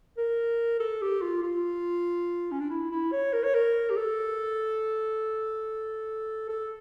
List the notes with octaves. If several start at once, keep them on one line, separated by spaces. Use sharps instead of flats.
A#4
A4
G4
F4
F4
C#4
D4
E4
E4
C#5
A#4
C#5
A#4
G4
A4
A4